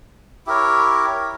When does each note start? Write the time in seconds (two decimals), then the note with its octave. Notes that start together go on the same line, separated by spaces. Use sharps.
0.46 E4 G4 A#4 C#5